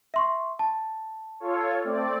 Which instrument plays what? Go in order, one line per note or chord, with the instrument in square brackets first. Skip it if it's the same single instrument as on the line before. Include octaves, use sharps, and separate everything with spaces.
[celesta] E5 C6 C#6
A5
[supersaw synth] F4 A4 C#5
A3 C4 D5